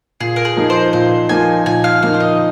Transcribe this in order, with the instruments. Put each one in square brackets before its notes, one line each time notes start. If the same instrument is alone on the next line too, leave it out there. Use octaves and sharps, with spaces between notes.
[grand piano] A#2 [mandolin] G#4
[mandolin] A#4
G#4
[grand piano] F3 A#3 D#4
[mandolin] C5
[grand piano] A#2 [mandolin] C5
[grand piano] F3 A#3 D#4 [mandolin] G#5
[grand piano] A#2 [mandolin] G#5
[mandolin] F5
[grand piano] F3 A#3 D#4 [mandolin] F5
[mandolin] C5
D#5